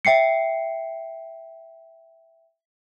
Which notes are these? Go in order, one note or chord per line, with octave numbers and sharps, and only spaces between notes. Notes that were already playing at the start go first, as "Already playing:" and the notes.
E5 G5 C7 C#7